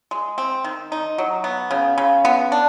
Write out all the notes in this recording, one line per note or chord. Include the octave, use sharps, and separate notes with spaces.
G#3
C4
D#3
D#4
F#3
B3
C#3
C#3
B3
D4